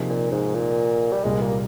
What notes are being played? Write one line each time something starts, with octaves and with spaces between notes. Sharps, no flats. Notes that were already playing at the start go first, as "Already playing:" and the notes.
Already playing: C3 F3 A#3 D#4 G#4
A#2
G#2
A#2
G3
C2 A#2 G3 G#3
A#3